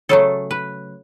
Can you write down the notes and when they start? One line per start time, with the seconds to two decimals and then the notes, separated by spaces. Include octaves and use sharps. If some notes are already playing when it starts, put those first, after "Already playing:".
0.09 C#3 F#3 A3 A4
0.51 B4